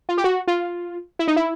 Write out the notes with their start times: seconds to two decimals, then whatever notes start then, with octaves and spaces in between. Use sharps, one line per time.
0.09 F4
0.18 G4
0.24 F#4
0.48 F4
1.19 E4
1.28 D#4
1.36 E4